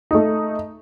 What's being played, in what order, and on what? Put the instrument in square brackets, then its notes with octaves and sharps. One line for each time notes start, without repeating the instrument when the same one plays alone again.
[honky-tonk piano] A3 D#4